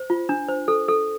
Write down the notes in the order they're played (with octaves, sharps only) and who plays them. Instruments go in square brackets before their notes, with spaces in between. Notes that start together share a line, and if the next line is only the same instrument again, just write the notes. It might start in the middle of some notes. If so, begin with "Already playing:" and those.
Already playing: [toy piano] C5
F4
D4
C5
A4
A4